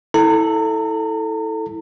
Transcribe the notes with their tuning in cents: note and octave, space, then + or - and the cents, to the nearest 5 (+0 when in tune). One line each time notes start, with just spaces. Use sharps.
E4 -20 A4 +0 A#5 -35